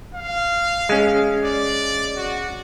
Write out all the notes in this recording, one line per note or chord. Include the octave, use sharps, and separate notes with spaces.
F5
G#3 C#4
D5
F#4